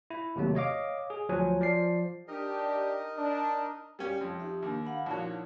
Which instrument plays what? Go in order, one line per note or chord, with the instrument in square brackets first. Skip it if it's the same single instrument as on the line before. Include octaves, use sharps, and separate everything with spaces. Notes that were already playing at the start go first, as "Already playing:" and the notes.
[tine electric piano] E4
D#2 C3 F#3 A3
C#5 D#5 F5 D6
G#4
D2 F3 F#3 C#5 G#5
F3 D5 C7
[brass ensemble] D4 G4 [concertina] D#4 A#4 D#5
[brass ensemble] D4
[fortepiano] G3 C#4 G4
F2
[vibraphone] D#4 G4 E5
[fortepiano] D#2 [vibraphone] A#3 D4
[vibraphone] F5 F#5 B5
[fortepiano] A#1 F#4 C#5 [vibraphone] D#4 E4